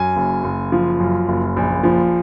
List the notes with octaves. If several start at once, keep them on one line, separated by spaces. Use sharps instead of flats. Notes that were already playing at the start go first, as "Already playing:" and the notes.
Already playing: F#2 G#5
F#1
F#1
F3
F#2
F#1
A#1
F3